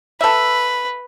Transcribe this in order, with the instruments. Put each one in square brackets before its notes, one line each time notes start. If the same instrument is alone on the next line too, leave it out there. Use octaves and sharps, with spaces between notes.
[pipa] A4 E5 [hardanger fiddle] B4